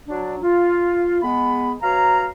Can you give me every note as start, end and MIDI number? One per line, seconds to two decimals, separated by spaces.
0.08 0.38 54
0.08 0.38 62
0.43 1.19 65
1.22 1.73 56
1.22 1.73 59
1.22 1.73 83
1.82 2.26 47
1.82 2.26 54
1.82 2.26 73
1.82 2.26 77
1.82 2.26 82